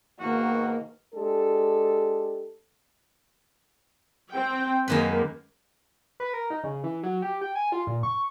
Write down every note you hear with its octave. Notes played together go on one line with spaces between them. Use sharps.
G#2 B2 D#3 A#3 F#4
G#3 D4 G4 A4
C4 G5
F#2 D#3 G#3 A#3 B4
B4
A#4
D#4
C#3
E3
F#3
G4
G5
G#5
F4
A#2
C#6